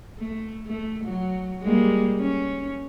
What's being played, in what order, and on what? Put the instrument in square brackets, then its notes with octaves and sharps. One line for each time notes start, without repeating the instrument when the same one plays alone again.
[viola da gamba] A3
A3
F#3
G3 G#3 A#3
C#4